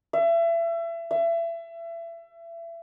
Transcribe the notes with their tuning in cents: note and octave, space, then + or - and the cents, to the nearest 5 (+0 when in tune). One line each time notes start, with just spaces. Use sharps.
E5 +30
E5 +30